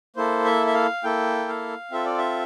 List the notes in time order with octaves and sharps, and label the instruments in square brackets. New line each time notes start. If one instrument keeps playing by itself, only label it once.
[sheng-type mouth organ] A#3 E4 A4 C5
E5
E5
F5
A#3 E4 A4 G5
F5
C4 F4 A4 E5
D5
E5